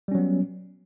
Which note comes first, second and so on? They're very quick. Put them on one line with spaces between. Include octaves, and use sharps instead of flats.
G3 C#4 F#3 B3